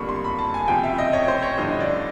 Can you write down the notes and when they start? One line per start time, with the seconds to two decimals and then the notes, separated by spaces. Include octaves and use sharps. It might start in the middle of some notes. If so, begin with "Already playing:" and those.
Already playing: F#1 F2 D3 G3 A#3 B5 C#6
0.09 C6
0.24 B5
0.39 A5
0.54 G#5
0.68 C#2 C3 F3 G5
0.84 E5
0.98 D#5
1.13 C#5
1.28 C5
1.43 C#5
1.58 A1 G2 D3 F3 D#5
1.80 D5